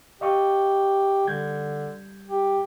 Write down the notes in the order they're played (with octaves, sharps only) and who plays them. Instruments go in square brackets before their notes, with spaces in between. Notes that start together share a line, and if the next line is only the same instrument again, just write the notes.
[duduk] G4 [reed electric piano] D#5 F5 C#6
[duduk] D3 [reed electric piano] G3 G6 G#6
[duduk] G4